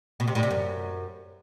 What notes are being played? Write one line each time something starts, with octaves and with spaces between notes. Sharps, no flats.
B2
C3
A2
C3
F#2